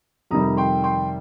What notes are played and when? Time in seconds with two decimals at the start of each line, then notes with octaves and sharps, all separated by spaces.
0.31 F2 C3 D#3 G3 A#5 D#6
0.57 G5 C6
0.84 G5 C6